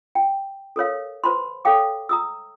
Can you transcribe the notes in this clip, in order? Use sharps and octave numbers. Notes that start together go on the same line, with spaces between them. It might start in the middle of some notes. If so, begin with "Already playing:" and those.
G5
A4 A#4 C#5 F5
B4 C5 A5 B5 C6
A4 C#5 F5 G5 D6
A#5 D#6 E6